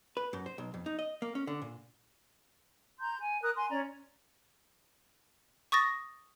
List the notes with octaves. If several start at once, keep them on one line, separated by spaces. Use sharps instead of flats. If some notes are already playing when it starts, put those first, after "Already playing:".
B4
F#2
C5
B1
F2
D#4
D#5
A#3
C#4
D3
A#2
A#5 C6 G6
G#5
A#4 D#6 F#6
G#5 C6
C#4 D5 A#5
C#6 D#6 A6 A#6